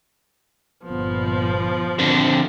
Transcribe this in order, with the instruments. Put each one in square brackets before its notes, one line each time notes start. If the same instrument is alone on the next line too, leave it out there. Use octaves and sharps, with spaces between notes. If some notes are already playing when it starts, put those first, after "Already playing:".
[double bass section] G1 A#2 B3 [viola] F3
[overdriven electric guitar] F2 D3 [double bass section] D#3